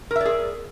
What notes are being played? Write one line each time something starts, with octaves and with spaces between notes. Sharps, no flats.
G#4 A#4 D5 E5